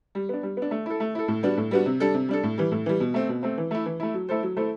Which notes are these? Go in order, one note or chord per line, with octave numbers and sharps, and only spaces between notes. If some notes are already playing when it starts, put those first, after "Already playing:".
G3
B3 D4
G3
B3 D4
A3
E4 A4
A3
E4 A4
A2
G3 B3 D4 F#4
A2
G3 B3 D4 F#4
C3
G3 D4 A4
C3
G3 D4 A4
A2
E3 G3
A2
E3 G3
B2
A3 C4
B2
A3 C4
E3
A3 E4
E3
A3 E4
F#3
A3 E4 A4 C5
F#3
A3 E4 A4 C5